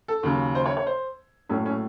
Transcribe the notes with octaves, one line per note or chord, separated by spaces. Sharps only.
A4
D#2 C#3 F#3
C5
C#5
C#5
C5
A#1 A2 F#3 A3 C#4
C#4